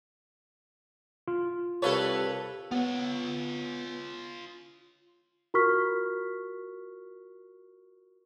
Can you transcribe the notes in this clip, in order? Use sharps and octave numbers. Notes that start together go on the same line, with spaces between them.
F4
C2 A4 B4 C#5 F5 A5
B3 F4 C#5
F4 F#4 A#4 C#6 F6 B6